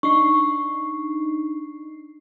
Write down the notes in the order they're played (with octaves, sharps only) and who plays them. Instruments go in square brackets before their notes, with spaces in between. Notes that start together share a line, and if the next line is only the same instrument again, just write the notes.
[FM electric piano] D4 D#4 C7 [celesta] C#6